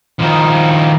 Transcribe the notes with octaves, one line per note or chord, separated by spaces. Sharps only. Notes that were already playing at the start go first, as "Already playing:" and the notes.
D#3 F3